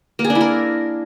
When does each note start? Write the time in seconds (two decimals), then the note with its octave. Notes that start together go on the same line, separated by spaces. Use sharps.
0.19 A#3
0.24 G#4
0.30 D4
0.35 E4
0.41 A#4